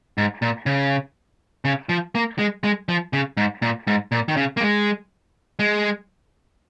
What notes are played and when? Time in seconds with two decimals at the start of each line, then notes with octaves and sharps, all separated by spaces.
0.18 G#2
0.42 A#2
0.66 C#3
1.65 C#3
1.89 F3
2.15 A#3
2.39 G#3
2.64 G#3
2.89 F3
3.13 C#3
3.37 G#2
3.62 A#2
3.87 G#2
4.12 A#2
4.28 D#3
4.37 C#3
4.57 A#3
4.61 G#3
5.59 G#3